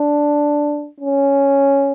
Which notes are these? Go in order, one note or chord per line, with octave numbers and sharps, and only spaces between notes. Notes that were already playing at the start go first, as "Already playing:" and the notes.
Already playing: D4
C#4